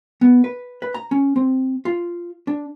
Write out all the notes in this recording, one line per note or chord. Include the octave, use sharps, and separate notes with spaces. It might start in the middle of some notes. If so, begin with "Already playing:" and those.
B3
B4
B4
A#5
C#4
C4
F4
D4